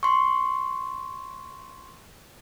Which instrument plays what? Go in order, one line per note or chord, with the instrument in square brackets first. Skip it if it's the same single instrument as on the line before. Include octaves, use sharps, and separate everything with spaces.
[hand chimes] C6 C#6